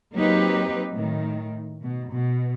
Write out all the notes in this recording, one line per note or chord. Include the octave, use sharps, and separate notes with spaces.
F#3 A#3 C4 D#4 G4 B4
A2 D#3
B2
B2